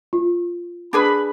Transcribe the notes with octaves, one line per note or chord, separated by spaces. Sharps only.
F4
D4 G#4 B4 B5